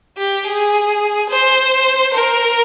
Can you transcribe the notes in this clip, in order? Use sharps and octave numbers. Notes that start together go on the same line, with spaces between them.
G4
G#4
C5
A#4